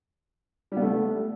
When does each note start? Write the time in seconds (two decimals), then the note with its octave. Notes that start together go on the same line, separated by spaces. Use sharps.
0.72 G3
0.77 B3
0.82 A3